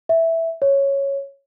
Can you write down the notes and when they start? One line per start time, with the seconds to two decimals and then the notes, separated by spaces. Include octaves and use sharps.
0.09 E5
0.62 C#5